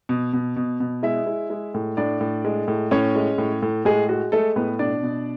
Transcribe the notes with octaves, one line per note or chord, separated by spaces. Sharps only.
B2
B2
B2
B2
G#3 E4 E5
G#3
G#3
A2
A2 D4 D5
A2
G#3
A2
A2 C#4 C#5
G#3
A2
A2
A2 G#3 G#4
G#3 F#4
G#3 A3 A4
A2 B3 B4
B2 D4 D5
B2